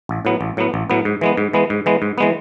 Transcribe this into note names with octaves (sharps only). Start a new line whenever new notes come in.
A1
A2 F#3 B3
A1
A2 F#3 B3
A1
A2 F#3 B3
G#2
E3 G#3 B3
G#2
E3 G#3 B3
G#2
E3 G#3 B3
G#2
E3 G#3 B3